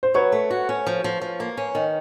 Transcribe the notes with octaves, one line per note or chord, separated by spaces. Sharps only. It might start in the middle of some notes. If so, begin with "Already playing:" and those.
C5
F#3 B4 C#5
A3
F#4
C#4
F3
F3
F3
A#3
C#4
D#3